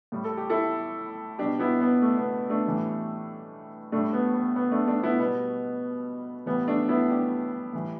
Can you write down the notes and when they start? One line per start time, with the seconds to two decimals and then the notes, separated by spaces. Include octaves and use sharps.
0.12 A2 G3
0.24 A4
0.37 G4
0.50 E4 A4
1.38 B2 G3 D4 G4
1.59 B3 E4
1.81 B3
2.02 A3
2.17 B3
2.50 A3 D4
2.66 A2 E3 G3
3.92 A2 G3 A3 D4
4.13 B3
4.34 B3
4.56 B3
4.72 A3 D4
4.87 A3 D4
5.03 B3 E4
5.19 B2 G3 B3
6.46 A2 E3 G3 B3
6.68 A3 D4
6.88 B3 E4
7.10 D4 G4
7.73 A2 E3 G3